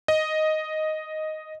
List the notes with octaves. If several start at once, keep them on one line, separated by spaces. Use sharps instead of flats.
D#5